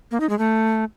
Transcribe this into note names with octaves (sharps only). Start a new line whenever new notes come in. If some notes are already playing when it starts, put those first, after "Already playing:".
A#3
D#4
G#3
A3